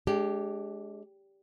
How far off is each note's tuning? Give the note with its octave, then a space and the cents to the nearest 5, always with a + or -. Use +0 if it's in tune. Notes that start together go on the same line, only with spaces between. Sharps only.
G#3 +25 D4 -30 G4 +0